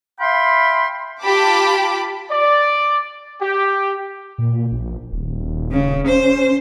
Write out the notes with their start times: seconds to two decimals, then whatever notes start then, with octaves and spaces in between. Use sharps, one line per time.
0.20 E5 F5 G5 B5 C6
1.22 F4 G4 A5 B5 D6
2.30 D5
3.41 G4
4.38 A#2
4.72 A#1
5.12 D#1
5.71 C#3
6.06 C#4 C5